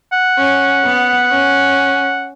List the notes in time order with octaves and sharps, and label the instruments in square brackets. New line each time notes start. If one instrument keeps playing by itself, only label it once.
[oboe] F#5
[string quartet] C#4
B3
C#4